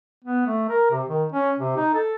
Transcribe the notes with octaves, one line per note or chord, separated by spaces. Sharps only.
B3
A3
A#4
C3
D#3
C#4
C3
D#4
A4